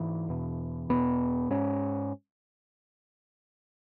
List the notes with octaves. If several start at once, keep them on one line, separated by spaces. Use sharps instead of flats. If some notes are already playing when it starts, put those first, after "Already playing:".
Already playing: G#2 E3
E2 B2
E2 B2 B3
G#2 C#4